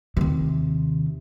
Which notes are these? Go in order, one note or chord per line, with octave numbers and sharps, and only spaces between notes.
D#2 C3